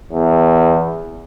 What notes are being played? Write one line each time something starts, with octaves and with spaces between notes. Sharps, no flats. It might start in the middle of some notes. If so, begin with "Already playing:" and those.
E2